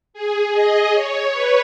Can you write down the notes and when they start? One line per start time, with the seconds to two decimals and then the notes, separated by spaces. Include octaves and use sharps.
0.14 G#4
0.53 D#5
0.93 C#5
1.33 B4